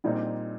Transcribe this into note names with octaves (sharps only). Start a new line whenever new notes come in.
A#1 A#2 G3 C4 D#4